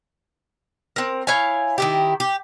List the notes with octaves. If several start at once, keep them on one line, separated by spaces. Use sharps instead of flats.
C4 A#4
E4 C#5 F5 G#5
D#3 E4 G4
G4